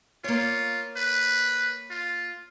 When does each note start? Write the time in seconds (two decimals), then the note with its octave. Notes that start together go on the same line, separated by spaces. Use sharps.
0.24 A#3 F4 C#5
0.97 B4
1.90 F4